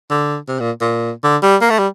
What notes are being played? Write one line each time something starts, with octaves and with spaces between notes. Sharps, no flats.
D3
C3
A#2
A#2
D3
G3
A#3
A3
G3